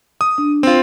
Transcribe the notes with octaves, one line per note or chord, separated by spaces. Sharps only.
D#6
D4
C4 F4